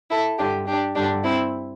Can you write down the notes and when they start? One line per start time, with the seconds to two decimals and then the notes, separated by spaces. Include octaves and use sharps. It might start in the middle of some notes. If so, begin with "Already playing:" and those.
0.10 E4 A4
0.38 G2 D4 G4
0.44 D3
0.66 D4 G4
0.95 G2 D3 D4 G4
1.23 C4 E4